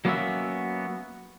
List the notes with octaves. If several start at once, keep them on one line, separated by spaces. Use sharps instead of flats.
F#3 A#3 B3 C#4 F#4 E5